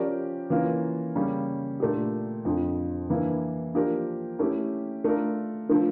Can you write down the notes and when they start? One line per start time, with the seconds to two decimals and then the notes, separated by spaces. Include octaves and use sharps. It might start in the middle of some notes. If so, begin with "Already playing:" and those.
Already playing: F3 C#4 G4 A#4 D5
0.50 E3 A#3 C#4 F4 A#4
1.15 C#3 G3 A#3 C#4
1.80 A#2 A3 D4 G4
2.45 F2 D3 F3
3.10 G2 E3 A#3 E4
3.75 F3 A#3 D4 G4 A#4
4.39 A3 C#4 E4 G4
5.04 A3 D4 F4 A#4
5.69 D3 F3 A3